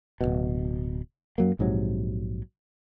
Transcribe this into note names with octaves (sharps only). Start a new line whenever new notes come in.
D1 G1 B2
F#2 F#3 A#3
A#1 G#2 C3 F#3